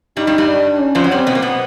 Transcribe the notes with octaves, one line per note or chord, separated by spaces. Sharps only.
G2 G3 D#4
G2 G3
G2 G3
D4
C#4
F2 F3
F#3
G2 G3 C4
B2 B3
A#3
B2 B3